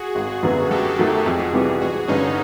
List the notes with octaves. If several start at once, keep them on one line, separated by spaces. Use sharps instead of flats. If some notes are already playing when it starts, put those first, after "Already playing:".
Already playing: F#4 G#4
G#1
F#2 D3 F#3 B3
F#2 G4 A4
D#3 F#3 A3
F2 F#4 G#4
C3 E3 G3
A1 F#4 G#4
G2 D3 C#4 D#4